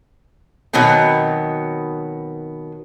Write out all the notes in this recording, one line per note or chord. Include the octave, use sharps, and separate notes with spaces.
B2 D#3 F#3 B3 C4